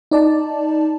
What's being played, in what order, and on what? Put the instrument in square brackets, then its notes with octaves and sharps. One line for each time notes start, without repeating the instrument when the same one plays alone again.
[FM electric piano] D#4 D5 A5